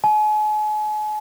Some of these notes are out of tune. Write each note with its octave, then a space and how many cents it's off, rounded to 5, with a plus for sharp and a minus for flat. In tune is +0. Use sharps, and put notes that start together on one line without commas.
G#5 +40